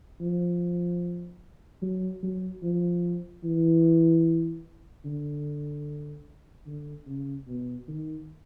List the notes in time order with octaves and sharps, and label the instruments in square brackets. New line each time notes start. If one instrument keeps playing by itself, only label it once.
[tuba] F3
F#3
F#3
F3
E3
D3
D3
C#3
B2
D#3